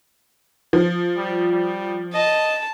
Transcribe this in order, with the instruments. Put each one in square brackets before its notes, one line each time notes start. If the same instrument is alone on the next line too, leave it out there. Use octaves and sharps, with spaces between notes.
[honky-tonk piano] F3
[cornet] G3
G3
[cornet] D#5 [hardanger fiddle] A5